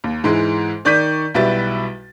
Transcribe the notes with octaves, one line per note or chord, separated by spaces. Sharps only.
D#2
G#2 E3 G#3
D#3 D5 C#6 G6 B6 D#7
B1 G3 E4 F#4 B4 A6